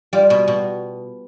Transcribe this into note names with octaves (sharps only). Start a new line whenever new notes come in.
G3 F4
B2
B2